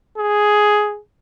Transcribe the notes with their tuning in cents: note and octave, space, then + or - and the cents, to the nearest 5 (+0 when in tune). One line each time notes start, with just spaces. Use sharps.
G#4 +5